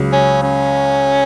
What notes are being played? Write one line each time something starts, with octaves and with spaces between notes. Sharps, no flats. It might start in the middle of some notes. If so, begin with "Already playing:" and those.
Already playing: C#2 C#3 F#3
C#4
C#4